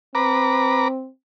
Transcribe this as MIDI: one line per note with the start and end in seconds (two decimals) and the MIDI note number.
0.15 1.08 60
0.15 0.88 71
0.15 0.88 82
0.15 0.88 86